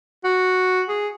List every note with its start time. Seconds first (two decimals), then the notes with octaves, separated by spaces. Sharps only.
0.24 F#4
0.89 G#4